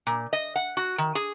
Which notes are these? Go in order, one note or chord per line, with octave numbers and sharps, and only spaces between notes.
A#2
D#5
F#5
F#4
D#3
G#4